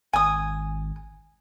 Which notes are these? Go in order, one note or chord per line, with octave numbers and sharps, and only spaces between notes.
G#1 G#5 D#6